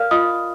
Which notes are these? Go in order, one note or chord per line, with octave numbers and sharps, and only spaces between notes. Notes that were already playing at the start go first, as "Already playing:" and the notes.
Already playing: A#4 D5 F5 F6
F4 D#5 D#6